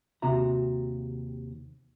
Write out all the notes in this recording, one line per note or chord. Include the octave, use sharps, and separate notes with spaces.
D#2 C3 F#4 E5 A#5